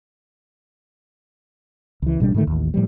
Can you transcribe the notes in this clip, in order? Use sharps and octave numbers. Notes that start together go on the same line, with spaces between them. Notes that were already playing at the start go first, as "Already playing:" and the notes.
C#2 E3
A1 B2 G3 D4
G#2 D3 D#3 A3
A1 D#2
A2 F3 G3